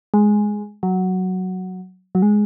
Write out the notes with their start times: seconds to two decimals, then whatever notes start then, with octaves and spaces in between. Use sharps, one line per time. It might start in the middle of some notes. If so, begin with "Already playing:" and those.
0.14 G#3
0.83 F#3
2.15 F#3
2.22 G#3